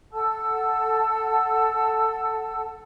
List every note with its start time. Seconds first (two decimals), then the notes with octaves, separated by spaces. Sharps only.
0.12 A4 F#5 A5 E6